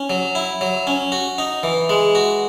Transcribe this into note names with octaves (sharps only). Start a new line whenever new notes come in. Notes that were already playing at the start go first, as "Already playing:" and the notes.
Already playing: C#4
F#3
E4
F#3
C#4
F#4
D#4
E3
G#3
F#4